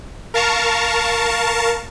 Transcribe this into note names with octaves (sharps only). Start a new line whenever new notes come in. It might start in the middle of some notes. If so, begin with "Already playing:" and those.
A#4 F5 A5 A#5 C#6